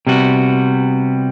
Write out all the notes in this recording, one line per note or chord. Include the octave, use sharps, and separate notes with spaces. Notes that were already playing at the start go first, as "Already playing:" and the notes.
C3 G3 B3 F#4